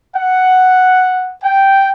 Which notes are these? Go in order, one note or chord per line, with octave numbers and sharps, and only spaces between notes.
F#5
G5